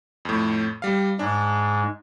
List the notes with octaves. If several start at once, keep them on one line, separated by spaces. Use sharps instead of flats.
F2 A2
G3 F5
G#2 G#3 D4